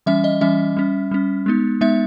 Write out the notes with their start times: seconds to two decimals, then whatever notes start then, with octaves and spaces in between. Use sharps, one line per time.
0.06 E3 G3 C#4 E5
0.24 D#5
0.41 E3 G3 C#4 E5
0.77 G3 C#4
1.11 G3 C#4
1.46 G#3 B3 D#4
1.81 G#3 B3 D#4 E5